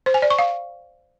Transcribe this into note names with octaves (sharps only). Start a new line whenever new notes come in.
C5
G#5
D5
C#6
F5